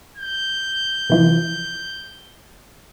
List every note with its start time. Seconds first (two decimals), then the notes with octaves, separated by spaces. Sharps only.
0.17 G6
1.10 C3 E3 F3